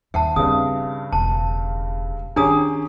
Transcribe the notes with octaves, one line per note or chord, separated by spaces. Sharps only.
D#2 E5 F#5 A5
G2 C#3 C4 D#6
E1 A5
D#3 C#4 D4 G4 G#4 A#5 D#6